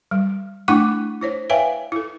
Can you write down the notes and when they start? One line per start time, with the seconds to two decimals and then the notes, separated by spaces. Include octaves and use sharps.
0.11 G3
0.68 A3 D4 E4 F#5 C#6 D6
1.21 E4 C5 C#5
1.50 B4 C#5 E5 F5 G5 G#5
1.92 E4 A4